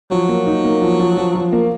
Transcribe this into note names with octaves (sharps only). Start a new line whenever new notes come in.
F3 F#3
A#3
D#4
A#3
F3
F3
F3
F3
A#3